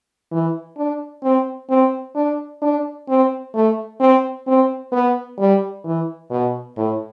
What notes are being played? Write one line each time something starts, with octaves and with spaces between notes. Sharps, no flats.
E3
D4
C4
C4
D4
D4
C4
A3
C4
C4
B3
G3
E3
B2
A2